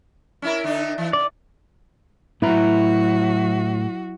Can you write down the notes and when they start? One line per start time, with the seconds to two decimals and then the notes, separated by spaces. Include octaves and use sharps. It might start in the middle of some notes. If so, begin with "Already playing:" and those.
0.42 C#4 E4 A#4
0.64 D3 D4 D#4
0.98 E3
1.13 C#3 D5
2.42 A2 F#3 E4 F#4 B4 A#5